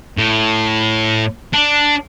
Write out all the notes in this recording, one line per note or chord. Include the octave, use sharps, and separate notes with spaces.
A2
D4